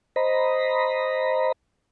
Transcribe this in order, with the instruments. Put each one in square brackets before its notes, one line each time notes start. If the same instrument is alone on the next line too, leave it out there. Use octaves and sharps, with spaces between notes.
[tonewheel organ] C5 D#5 A#5 B5